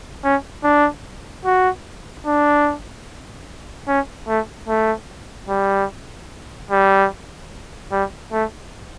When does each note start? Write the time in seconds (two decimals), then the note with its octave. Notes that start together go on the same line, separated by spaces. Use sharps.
0.24 C#4
0.64 D4
1.45 F#4
2.26 D4
3.88 C#4
4.28 A3
4.68 A3
5.49 G3
6.71 G3
7.92 G3
8.32 A3